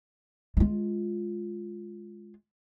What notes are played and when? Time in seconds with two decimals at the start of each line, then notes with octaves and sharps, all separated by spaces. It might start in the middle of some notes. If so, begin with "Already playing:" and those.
0.57 G#3 F4